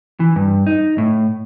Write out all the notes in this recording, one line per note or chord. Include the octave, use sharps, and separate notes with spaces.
E3
G2
D#4
A2